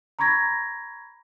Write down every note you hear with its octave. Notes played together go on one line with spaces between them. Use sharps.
A#5 B5 C#6 G#6 A#6